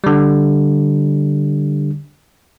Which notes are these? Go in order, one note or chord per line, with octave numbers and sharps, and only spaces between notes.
D3 G3